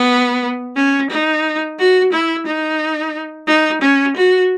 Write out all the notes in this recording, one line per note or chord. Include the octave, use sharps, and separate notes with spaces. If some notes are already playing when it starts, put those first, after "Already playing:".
Already playing: B3
C#4
D#4
F#4
E4
D#4
D#4
C#4
F#4